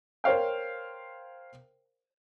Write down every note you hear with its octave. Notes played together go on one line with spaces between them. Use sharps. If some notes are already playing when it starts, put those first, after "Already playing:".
A#4 C5 C#5 F5 G5